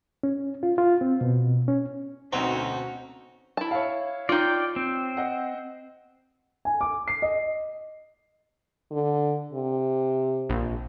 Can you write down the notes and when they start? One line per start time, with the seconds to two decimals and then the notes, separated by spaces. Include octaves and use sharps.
0.23 C#4
0.63 F4
0.78 F4
1.01 C4
1.21 B2
1.68 C#4
2.33 D2 B2 C4 C#4 D#4 F#4 F#5 A#5
3.57 E4 A5
3.71 C#5 E5 F5
4.29 D#4 F4 D5 G5
4.76 C4
5.17 D#5 F#5
6.65 G#5
6.81 D6
7.08 C7
7.22 D#5
8.91 D3
9.53 C3
10.49 A#1